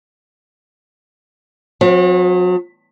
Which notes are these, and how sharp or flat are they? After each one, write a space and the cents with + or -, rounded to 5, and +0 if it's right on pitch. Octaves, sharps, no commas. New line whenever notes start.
F#3 -40 C4 +5